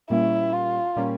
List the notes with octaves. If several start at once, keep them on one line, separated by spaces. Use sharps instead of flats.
A#2 G3 A#3 C#4 E4
F4
A#2 G3 A#3 C#4